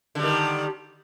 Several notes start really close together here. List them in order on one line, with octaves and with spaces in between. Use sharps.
D3 G3 D#3